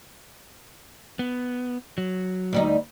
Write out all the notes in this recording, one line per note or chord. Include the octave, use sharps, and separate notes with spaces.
B3
F#3
D2 G3 D#4